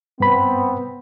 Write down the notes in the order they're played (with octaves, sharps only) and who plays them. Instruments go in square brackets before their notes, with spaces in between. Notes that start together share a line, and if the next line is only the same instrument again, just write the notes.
[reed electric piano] G2 B5 [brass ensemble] B3 C4